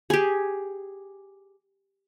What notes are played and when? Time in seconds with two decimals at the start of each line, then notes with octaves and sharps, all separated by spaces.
0.10 G4 G#4